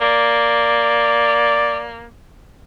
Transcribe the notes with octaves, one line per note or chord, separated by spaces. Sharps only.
A#3 D5